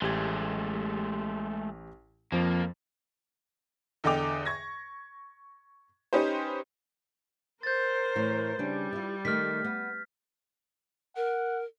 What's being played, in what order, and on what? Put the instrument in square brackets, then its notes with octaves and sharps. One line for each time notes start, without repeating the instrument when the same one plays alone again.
[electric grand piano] A1 G4 G#6 [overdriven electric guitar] G#3 A3
[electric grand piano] F2 F3 [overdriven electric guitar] A#3
[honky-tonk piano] E2 D3 D#5 G5 D6 F7
C#6 G#6 A#6
C#4 D#4 G4 B4 C5
[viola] A#4 C5 [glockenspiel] G6 A6
[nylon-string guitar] A2 E3
[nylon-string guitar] C#3 D4 [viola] G3
[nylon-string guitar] E4 F4
[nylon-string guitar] D#3 A3 [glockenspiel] F6 B6
[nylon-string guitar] B3
[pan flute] A#4 [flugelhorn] F#5